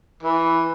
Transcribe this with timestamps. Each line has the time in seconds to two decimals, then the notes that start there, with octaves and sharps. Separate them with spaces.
0.23 E3